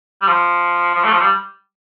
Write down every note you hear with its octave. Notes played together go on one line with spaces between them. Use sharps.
G3
F3
F3
A3
F3
G3